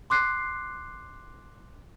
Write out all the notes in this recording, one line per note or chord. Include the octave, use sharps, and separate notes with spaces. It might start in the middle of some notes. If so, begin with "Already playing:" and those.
C6 D6 F#6 C7